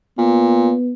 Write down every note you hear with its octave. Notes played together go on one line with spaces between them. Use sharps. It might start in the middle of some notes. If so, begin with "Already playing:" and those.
A#2 B3